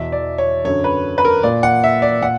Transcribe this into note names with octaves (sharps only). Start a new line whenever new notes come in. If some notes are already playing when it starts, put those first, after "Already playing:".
Already playing: E2 B2 E5
D5
C#5
F#2 D3 C#5
B4
B4
A#4
A#2 D5
F#5
E5
D5
A#2 F#5